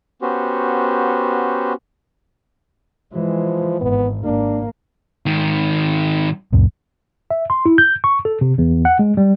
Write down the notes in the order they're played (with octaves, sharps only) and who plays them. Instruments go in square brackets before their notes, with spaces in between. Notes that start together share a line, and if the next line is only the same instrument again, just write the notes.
[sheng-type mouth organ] B3 C#4 F#4 G4 C5
[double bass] E3 G#3 [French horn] F3
[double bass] G#1 [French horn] B3
[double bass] G#1 A#3 [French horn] D4
[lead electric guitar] G#2 D#3
[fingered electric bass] C#2 F#2 A#2
[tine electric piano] E5
C6
E4
G6
C#6
A4
C3
E2
F#5
G#3
G3